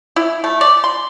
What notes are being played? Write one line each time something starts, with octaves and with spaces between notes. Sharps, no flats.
E4
A3
D5
C6